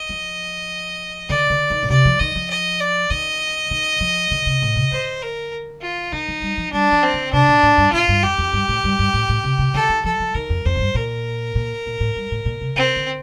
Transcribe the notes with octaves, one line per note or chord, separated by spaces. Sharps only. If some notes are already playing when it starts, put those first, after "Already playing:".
Already playing: D#5
F3
D3 D5
D3
D#3
A#2
C3 D5
F3
D#3 D#5
F3
D#5
D5
D#3 D#5
D#3
F3
D3
C3
A2
C3
D3 C5
A#4
F4
D#3 D#4
F3
G3
F3
G3 D4
F3
C4
D3
C3 D4
A#2
A2
G2
A2 F4
G2
F2 G4
F2
G2
A2
G2
G2
A2
A2
C3
C3
D3 A4
D#3
F3 A4
F3
D#3 A#4
F2
F2 C5
A2
G2
A#2 A#4
A#2
A#2
A2
G2
A2
A#2
C3
C3 C4
D3